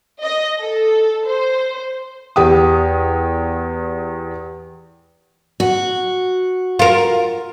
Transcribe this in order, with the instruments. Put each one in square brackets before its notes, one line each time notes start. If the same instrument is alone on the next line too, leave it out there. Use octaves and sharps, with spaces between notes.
[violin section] D#5
A4
C5
[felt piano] E2 G4 D#6
[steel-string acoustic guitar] F#4
[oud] F4 A#4